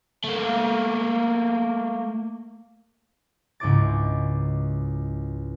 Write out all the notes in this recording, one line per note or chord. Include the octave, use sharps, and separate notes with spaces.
A3 A#3
C#2 G#2 E4 C#5 D6 A6